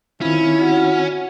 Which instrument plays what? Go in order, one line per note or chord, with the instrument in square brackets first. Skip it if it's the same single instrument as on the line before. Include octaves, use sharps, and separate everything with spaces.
[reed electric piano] D#3 C4 F4 [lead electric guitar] C#4 [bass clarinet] E4
[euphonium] F#4